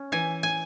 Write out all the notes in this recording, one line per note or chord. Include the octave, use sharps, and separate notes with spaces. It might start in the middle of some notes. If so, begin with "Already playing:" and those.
Already playing: C#4
E3 G#5
G#5